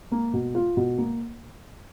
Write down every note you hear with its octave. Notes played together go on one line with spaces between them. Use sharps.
A#3
B2
F4
B2
A#3